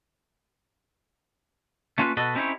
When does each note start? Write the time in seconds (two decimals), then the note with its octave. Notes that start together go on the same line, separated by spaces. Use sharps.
1.98 A3 A#3 C#4 F4 B4
2.17 B2 F#4 A4 B4 D#5
2.35 C4 C#4 D#4 E4 G4 C#5